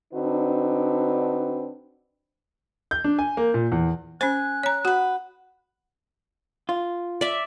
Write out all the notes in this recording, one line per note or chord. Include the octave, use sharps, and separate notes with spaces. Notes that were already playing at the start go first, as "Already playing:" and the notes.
D3 C4 D4 D#4 F#4 B4
G6
D4
G#5
A#3
A#2
E2
C#4 C5 G#5 F#6
C#5 A#5
F#4 B4 F#5
F4
D5 E5